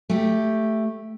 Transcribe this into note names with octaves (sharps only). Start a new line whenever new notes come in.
A3 G4